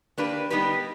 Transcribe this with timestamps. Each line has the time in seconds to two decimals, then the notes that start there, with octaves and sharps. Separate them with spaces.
0.18 A#3 D4 G4 B4
0.51 G3 B3 D#4 G4 B4